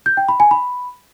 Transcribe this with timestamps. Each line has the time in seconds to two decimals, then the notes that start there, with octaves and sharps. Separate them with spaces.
0.06 G6
0.17 G5
0.28 B5
0.40 G#5
0.51 B5